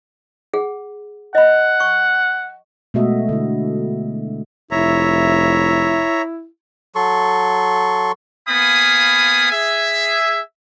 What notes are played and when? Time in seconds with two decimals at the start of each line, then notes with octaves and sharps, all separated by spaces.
0.54 G#4 F#5
1.35 D#5 F#5 B5
1.80 C#6
2.94 B2 G#3 A3 F#4 D#5 E5
3.29 D3 E4
4.71 F1 E4 C#5 E5 A#5
6.95 F#3 A4 C6 C#6
8.48 A#3 B3 F5 G#5 B5 D#6
9.52 G#4 E5